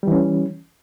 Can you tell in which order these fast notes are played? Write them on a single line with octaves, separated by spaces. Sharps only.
G3 E3 C#4